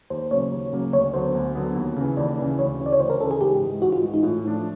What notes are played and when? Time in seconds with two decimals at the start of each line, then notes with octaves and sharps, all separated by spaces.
0.10 D#2 C5
0.31 C#3 F#3 A#3 C#5
0.52 D#2
0.73 C#3 F#3 A#3
0.93 D2 C#5
1.14 D3 F#3 B3 C5
1.35 D2
1.55 D3 F#3 B3
1.76 D#2
1.96 C#3 E3
2.17 D#2 D5
2.38 C#3 E3
2.58 D2 C#5
2.79 C#3 E3
2.86 D5
2.93 C#5
3.00 D2 C5
3.10 A#4
3.21 C#3 E3 A4
3.31 G#4
3.41 G#2 G4
3.62 E3 G#3
3.82 G#2 F#4
3.92 F4
4.03 E3 G#3
4.14 D#4
4.23 A2 F4
4.45 F3 A3 D4